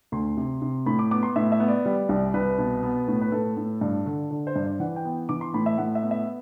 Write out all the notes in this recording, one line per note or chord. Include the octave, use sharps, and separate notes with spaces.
D2 C6
C3
C3
A2 B5
D6
B3 D6
C6
A2 E5
E5
B3
D5
G3
C2
C2 B4
B2
B3
A2
B4
A2 A4
A2
G2
D3
D3
C5
G2
D5
E3 F#5
G5
B3
E3 D6
C6
A2 B5
E5
A2 F#5
E5
B3
E5